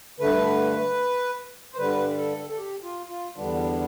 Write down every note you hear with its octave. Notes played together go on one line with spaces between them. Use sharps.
G2 D3 A3 B4
C5
G2 D3 G3 B4
A4
A4
G4
F4
F4
E2 D3 G3 B3 D4